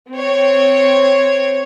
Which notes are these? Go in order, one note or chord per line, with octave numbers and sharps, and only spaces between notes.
C4 C#5